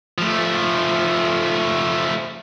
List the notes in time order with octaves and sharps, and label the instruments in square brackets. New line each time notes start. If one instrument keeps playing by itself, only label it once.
[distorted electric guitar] F3 A3